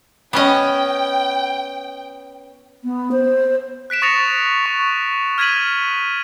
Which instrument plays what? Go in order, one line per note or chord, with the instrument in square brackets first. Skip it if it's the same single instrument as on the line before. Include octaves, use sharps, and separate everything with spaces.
[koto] B3 C#4 D#5 [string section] G5
[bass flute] B3
C5
[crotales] F#6 B6 D7 E7
C#6 D#6 A6 A#6 C#7 F7
C#6
F6 G#6 B6 D#7 F#7